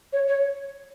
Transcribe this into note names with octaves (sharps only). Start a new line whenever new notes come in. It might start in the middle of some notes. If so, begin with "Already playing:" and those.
C#5
C#5